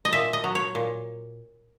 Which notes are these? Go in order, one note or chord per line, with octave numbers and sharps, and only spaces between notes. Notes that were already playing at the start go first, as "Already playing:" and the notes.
D#5
A#2 E5
D#5
F#3
C#5
A#2